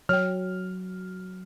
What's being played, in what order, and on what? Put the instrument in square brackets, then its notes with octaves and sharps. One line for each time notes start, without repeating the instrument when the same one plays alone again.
[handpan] F#3 [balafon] C#5 G5 [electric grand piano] F6